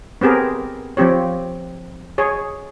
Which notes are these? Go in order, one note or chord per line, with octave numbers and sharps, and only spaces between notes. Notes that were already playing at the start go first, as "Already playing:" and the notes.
B3 C4 G4 G#4 A#4
F3 C4 G4 C#5
G#4 C#5